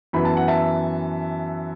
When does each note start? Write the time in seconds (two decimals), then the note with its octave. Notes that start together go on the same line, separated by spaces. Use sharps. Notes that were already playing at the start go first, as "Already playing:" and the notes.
0.13 F#2 E3 B3 B5
0.25 A5
0.37 F#5
0.48 E5 A5